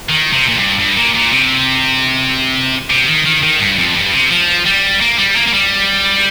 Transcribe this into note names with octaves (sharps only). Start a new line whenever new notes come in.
D#3
C3
A#2
G2
G2
A#2
A#2
C3
C3
D#3
D#3
D#3
G2
F2
G2
C3
F3
G3
A#3
G3
A#3
A#3
G3